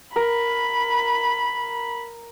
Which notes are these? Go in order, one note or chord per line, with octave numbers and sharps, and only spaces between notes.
A#4 B5